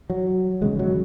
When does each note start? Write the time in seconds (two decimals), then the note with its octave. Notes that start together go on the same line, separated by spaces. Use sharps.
0.10 F#3
0.61 E1 D#2 C#3 G#3
0.79 F#3